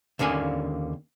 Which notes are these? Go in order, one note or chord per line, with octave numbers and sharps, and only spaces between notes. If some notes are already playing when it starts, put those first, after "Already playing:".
D#2 D3 A#3 C#4 G#5